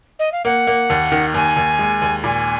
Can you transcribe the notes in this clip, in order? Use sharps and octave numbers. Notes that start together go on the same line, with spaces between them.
D#5
F5
A#3 F#5
A#3
D#2
D#3
D#2 G#5
D#2
G#3
D#2
A#2 G#5